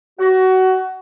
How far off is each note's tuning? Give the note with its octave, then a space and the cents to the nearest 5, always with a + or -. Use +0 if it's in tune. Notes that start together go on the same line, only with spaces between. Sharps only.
F#4 +20